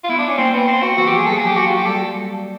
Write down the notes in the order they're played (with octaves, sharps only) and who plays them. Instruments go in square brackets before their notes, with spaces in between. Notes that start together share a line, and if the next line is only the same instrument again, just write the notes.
[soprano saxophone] F4
[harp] B3 [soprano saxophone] E4
[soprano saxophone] D4
C#4
[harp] A#3 [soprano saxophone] C4
[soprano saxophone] B3
C4
F#4
[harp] E3 [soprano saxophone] F#4
[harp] F3 [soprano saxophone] G4
[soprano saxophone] G#4
[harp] F#3 [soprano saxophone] A4
[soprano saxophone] G#4
G4
F#4
F4
G4
[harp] G3 [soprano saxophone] A4